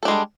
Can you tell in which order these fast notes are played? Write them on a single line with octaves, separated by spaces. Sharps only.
A4 D4 G#3 G3